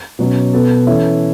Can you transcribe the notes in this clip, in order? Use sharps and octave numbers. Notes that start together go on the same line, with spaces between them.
B2 F#3 C#4
B2 B3 A4
E3 C#4 E4 A4